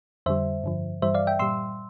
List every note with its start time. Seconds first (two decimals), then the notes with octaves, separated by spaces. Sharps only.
0.26 F2 D3 G3 C5 E5
0.64 G2 D3 F3
1.02 G2 E3 G3 C5 E5
1.14 D5 F5
1.27 E5 G5
1.39 A#2 G3 C6 E6